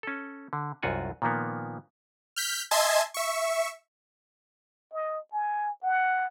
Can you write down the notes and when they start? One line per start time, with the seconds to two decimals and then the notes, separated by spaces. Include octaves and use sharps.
0.03 C#4 A4
0.53 D3
0.83 C2 F#2 F4 F#4 F#5 G#5
1.22 A#2 D#3 F3 A#3 B3
2.36 F6 G6 B6
2.71 D#5 E5 G#5 A5 C6 G#6
3.14 E5 C#6
4.93 D#5
5.32 G#5
5.83 F#5